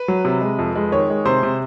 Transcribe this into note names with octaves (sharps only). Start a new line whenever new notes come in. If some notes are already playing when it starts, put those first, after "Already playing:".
Already playing: B4
F#3
C3
G#3
F2
G#3
D#3 C#5
G#3
C3 C5
C3